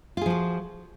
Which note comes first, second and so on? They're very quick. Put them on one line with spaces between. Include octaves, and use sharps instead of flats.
F4 G#4 F3 F#4